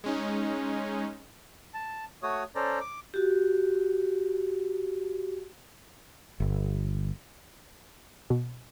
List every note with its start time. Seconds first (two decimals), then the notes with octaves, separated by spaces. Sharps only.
0.04 G#3 C#4 D#4
1.74 A5
2.23 A3 F#4 C#5 D#6
2.55 C#4 A4 C5 D5 A#5
2.80 D6
3.14 F#4 G4
6.40 G1
8.30 B2